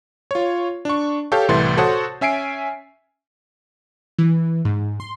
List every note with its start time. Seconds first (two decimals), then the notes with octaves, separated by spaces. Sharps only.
0.31 F4 C#5
0.85 D4 C#6
1.32 G4 A4 C#5 F5 G6
1.49 C2 A2 E3 E5 C6 A6
1.77 F#4 A4 C5 C#5 F#5 D#6
2.21 C#4 E5 G#5 C7 D7
4.18 E3
4.65 G#2
5.00 C6